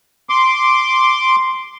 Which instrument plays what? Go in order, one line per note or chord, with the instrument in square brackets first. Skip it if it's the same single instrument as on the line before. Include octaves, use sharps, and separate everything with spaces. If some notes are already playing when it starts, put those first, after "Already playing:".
[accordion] C6 D6